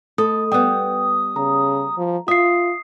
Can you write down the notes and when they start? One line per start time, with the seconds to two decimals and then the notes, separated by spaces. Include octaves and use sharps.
0.18 A3 A4 D#6
0.52 G3 B3 G5 D#6
1.36 C#3 A#5
1.98 F3
2.28 F4 E5 D#6 C7